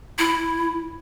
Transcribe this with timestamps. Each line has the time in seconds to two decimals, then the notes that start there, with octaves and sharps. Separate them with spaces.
0.18 E4